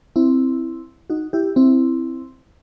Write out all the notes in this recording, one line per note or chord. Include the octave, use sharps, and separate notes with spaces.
C4 E4
D#4 F#4
E4 G4
C4 E4